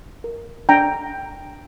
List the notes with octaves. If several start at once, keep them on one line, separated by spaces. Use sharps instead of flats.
A#4
D4 G5 A#5